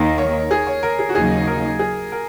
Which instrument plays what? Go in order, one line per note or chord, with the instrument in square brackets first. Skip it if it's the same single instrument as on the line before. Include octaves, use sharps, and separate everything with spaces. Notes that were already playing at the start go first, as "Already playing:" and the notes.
Already playing: [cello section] D#2 D#3 A#3 [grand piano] A#4
[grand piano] C#5
G#4
C#5
A#4
G#4
F#4
[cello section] D#2 C#3 F#3 A#3 D#4 [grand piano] G#4
[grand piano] A#4
G#4
A#4